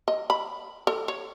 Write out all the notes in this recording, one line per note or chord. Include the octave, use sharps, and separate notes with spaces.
D#5
B5
A4
C#5